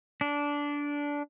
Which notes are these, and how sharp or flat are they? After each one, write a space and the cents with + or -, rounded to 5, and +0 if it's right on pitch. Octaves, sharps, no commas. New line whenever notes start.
D4 -15